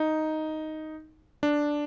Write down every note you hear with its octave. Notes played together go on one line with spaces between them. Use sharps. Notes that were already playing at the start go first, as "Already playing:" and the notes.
Already playing: D#4
D4